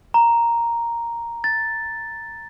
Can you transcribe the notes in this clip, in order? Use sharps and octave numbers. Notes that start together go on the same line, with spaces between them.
A#5
A6